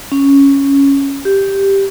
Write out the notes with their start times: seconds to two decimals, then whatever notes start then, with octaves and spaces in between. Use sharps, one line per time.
0.12 C#4
1.25 G4